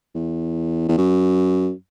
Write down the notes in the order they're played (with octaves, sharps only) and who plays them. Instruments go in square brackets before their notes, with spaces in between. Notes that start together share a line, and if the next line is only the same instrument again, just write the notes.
[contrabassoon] E2
E2
F#2